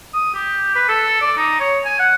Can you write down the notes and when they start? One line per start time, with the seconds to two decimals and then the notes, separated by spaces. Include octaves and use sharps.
0.14 D#6
0.34 G4
0.75 B4
0.89 A4
1.22 D5
1.37 D#4
1.60 C#5
1.85 G#5
1.99 F#5